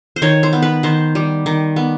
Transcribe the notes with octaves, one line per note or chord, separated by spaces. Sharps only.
C5
D#3 C#5
C5
B3
B4
D#3 C5
G3
D#3
B3